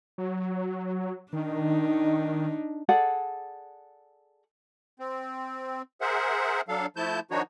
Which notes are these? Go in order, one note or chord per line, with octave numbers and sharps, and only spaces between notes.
F#3
D#3 D4 D#4
G#4 A4 D5 F#5
C4
G#4 A#4 C5 E5 F#5
F#3 D4 A4 F5
F3 A3 E4 A5 G6
D#3 F3 D4 D#4 F#4 C#5